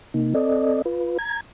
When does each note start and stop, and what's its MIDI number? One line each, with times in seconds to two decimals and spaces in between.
0.14 0.34 48
0.14 0.34 58
0.14 0.34 63
0.34 0.82 60
0.34 0.82 69
0.34 0.82 74
0.34 0.82 75
0.85 1.18 65
0.85 1.18 71
1.19 1.41 82
1.19 1.41 92